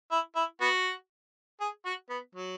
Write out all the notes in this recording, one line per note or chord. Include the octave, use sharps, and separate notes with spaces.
E4
E4
B3 F#4
G#4
F#4
B3
F#3